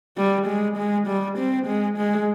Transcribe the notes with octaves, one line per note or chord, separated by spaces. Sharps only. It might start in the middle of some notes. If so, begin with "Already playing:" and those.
G3
G#3
G#3
G3
C4
G#3
G#3